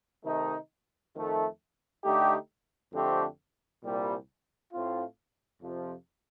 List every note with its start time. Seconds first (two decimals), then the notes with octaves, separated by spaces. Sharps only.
0.24 C3 D#3 A3 D#4
1.14 F2 D#3 A3
2.03 D3 A3 D#4 G4
2.93 F2 D3 A3 C4 G4
3.83 C2 A#2 G3
4.72 A2 A3 C4 F4
5.61 F2 C3 F3